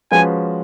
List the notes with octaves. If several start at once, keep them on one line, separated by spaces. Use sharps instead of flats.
F3 G#3 C#4 F#4 B4 G#5